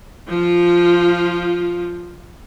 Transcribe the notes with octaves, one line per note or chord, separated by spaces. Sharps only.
F3 F4